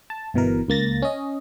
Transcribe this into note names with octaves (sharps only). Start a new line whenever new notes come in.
A5
G1 B2 E3 A#4
C#2 A#3 A6 A#6
C#4 D#5